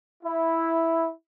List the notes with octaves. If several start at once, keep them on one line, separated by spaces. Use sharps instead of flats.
E4